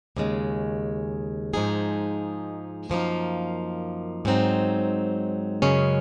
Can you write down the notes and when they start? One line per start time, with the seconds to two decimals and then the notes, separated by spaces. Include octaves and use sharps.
0.17 D#2 C#3 G#3
1.54 G#2 F3 G#3 D#4 G#4
2.90 F#2 F3 A#3 D#4
4.25 G#2 F#3 C4 D#4
5.62 F#2 C#3 G#3 C#4